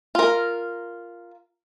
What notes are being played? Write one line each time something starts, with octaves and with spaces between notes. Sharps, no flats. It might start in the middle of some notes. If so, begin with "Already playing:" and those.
F4 A#4